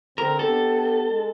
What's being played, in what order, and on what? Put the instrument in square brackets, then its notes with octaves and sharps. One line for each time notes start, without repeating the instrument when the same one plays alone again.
[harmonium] D3 C4 [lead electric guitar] A#4
[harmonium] B3 D4 G4 [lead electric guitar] A4
[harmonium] G#3